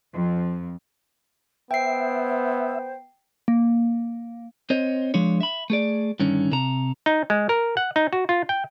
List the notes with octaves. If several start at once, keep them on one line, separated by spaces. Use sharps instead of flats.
F2
B3 C5 E5 G5 C7
A#3
C4 C5 C#5 D#5
F3 G#3 D4 C#5
E5 B5
A3 G#4 D5
G2 D3 D#3 C#4
C3 A4 A#5
D#4
G#3
A#4
F#5
D#4
F#4
F4
G5